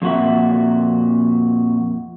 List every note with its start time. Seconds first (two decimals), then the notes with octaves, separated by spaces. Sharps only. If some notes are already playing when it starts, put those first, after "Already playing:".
0.02 F2 A#2 F#4 E5